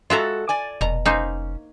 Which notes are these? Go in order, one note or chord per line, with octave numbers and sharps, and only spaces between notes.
G#3 F4 F#4 A4 E5 A#5
D5 G#5
F1 B2 A#5
A#3 C#4 D#4 C5